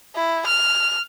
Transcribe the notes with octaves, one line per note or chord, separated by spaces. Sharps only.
E4
F6